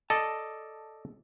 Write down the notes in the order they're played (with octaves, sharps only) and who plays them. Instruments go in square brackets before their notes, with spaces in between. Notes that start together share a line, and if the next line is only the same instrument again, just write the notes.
[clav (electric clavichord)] A4 D5 D#5 [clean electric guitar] A5